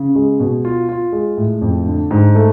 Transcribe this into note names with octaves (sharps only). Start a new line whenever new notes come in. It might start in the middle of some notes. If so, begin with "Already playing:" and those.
Already playing: C#3
G#3
B2
F4
F4
G#3
A2
F2
D3
G#2
A3